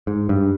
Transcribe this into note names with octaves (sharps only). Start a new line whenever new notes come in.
G#2
G2